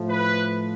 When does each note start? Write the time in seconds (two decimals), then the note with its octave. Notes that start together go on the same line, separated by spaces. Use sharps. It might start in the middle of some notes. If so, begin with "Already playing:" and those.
Already playing: A2 F3
0.09 B4